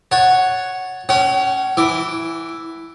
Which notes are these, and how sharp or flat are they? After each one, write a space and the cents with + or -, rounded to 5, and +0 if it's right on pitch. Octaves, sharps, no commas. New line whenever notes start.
C#5 +0 F#5 +0 A5 +0
C#4 +0 C#5 +0 F#5 +40
E3 +0 D6 +0